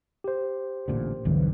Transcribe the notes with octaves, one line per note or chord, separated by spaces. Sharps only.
G4 C5
A1 A#2 D3
B1 E2 G2 D3 E3 F#3